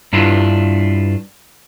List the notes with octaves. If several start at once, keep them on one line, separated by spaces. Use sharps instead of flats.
G2 D4 E4 F4